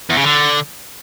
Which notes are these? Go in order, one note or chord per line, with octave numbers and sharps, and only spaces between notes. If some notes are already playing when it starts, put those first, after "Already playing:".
E2
C#3
D3